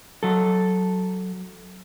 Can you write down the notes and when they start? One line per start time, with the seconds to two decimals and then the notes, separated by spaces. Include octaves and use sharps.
0.23 F#3 A4